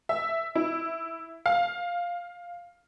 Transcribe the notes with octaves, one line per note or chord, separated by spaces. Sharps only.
E5
E4
F5